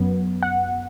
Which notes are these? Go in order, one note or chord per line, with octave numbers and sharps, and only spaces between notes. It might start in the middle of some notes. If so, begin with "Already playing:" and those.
Already playing: F#2 F#3 B3
F#5